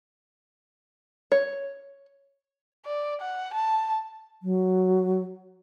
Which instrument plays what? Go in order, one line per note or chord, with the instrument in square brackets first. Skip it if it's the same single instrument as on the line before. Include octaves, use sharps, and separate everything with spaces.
[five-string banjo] C#5
[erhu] D5
F#5
A5
[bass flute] F#3